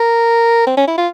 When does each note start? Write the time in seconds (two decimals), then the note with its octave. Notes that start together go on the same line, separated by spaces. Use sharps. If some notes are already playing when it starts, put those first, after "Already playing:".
Already playing: A#4
0.67 C4
0.77 C#4
0.87 E4
0.98 F4